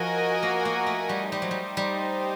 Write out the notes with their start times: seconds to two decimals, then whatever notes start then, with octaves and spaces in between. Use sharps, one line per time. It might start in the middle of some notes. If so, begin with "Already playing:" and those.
Already playing: F3 F#4 A#4 D#5 G#5
0.43 A#3
0.65 A#3
0.86 A3
1.09 G3
1.32 G3 D#4 G4 C5 D#5
1.42 F#3
1.51 G3
1.77 G3